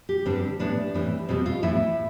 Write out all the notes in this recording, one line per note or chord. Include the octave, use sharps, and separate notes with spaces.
G4
G2 D3 G3 C4
A2 E3 B3 D4
A2 E3 G3 C4
E2 B2 G3 B3 C4
F4
A2 E3 B3 E4